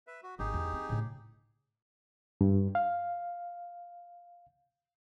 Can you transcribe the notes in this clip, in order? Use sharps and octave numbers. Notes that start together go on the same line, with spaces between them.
B4 E5
F#4
G#1 D#4 G4 G#4
E2
C4
A2 C#3
G2
F5